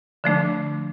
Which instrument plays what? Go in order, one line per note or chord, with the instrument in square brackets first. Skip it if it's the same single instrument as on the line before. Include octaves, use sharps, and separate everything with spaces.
[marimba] D3 F3 A3 D4